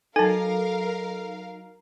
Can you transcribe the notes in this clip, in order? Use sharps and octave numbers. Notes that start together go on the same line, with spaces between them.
F#3 D#4 A4 A#4 F5 G#5 A5